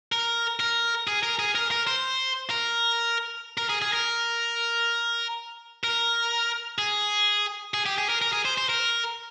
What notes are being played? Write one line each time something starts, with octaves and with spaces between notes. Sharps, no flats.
A#4
A#4
G#4
A#4
G#4
A#4
A#4
C5
A#4
A#4
G#4
G#4
A#4
A#4
G#4
G#4
G4
G#4
A#4
A#4
G#4
C5
C5
A#4